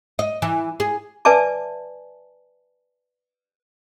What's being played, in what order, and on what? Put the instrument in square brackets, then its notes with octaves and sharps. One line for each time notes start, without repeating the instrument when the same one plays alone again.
[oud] D#5
E3
G#4
[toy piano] B4 D5 E5 G#5 A5 D6